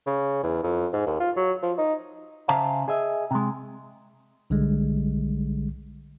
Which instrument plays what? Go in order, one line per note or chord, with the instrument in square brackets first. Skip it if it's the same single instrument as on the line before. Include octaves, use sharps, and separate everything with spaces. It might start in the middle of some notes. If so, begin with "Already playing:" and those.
[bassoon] C#3
E2
F2
G#2
D#2
F4
F#3
F3
D#4
[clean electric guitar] C#3 C5 E5 F5 A5 A#5
G#4 D#5 E5
C3 G#3
[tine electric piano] B1 D3 G3 G#3